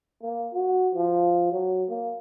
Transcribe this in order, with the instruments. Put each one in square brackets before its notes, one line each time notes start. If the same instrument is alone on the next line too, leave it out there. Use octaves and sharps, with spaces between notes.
[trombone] A#3
F#4
F3
F#3
A#3